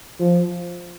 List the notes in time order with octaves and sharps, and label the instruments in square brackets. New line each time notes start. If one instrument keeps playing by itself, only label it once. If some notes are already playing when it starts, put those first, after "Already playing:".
[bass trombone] F3